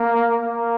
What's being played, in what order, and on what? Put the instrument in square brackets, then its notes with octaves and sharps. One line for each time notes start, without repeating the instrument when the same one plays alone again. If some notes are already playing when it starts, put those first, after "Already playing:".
Already playing: [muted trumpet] A#3
A#3